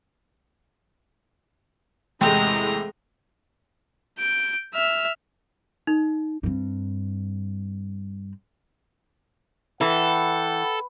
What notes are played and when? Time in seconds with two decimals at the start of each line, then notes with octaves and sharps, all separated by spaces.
2.21 E2 A2 C3 G#3 A3 C4 A#5
4.19 G6 D7
4.74 E5 F6
5.87 D#4
6.43 G2 C4
9.81 E3 A4 F#5 G5